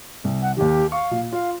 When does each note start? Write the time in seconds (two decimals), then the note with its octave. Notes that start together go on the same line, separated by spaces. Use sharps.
0.24 C2
0.42 F#5
0.57 D#2 D#3 G4
0.92 F5 C#6
1.11 A#2
1.32 F4 F5